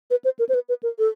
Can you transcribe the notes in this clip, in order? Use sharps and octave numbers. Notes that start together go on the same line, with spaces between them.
B4
C5
A#4
C5
B4
B4
A#4
A4